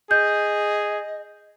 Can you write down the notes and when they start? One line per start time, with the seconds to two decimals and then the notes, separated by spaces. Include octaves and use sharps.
0.11 G#4 D#5 G6